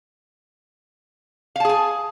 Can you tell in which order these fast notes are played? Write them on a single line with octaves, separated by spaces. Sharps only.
F5 A5 G#4 G#5